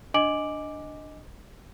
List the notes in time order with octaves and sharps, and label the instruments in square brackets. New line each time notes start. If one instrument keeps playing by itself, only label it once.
[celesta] D4 D#5 G#5 D6 D7 F#7